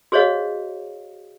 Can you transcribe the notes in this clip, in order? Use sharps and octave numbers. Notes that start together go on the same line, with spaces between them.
F#4 G#4 C5 C#5 D#5 F5